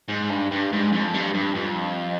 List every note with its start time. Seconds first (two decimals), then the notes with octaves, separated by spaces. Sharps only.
0.09 G#2
0.30 G2
0.51 G2
0.72 G#2
0.92 F2
1.14 G2
1.34 G2
1.55 F2